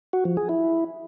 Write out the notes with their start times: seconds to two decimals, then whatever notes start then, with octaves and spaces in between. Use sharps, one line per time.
0.13 F#4
0.25 F3
0.37 G#4
0.49 E4